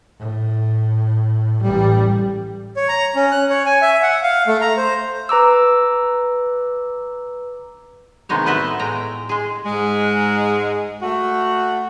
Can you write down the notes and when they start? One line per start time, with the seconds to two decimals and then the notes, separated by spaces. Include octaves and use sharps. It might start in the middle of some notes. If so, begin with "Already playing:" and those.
0.20 A2
1.62 A1 G3
2.76 C#5
2.89 A#5
3.15 C#4
3.32 F#6
3.50 C#5
3.66 G#5
3.82 E5
4.03 F#5
4.23 F5
4.47 A3
4.61 A#5
4.77 C5
5.29 B4 A#5 D6 E6
8.29 C3 D#3 G#3 B3 D#4 C#5
8.46 A2 B3 F#4 B4 D#5 E5
8.79 A2 G#3 G5 A#5
9.29 G#3 G#4
9.66 G#2 G#3
11.01 A3 F#4